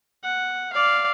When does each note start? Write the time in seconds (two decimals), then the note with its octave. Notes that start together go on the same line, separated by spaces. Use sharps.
0.24 F#5
0.73 D5 F5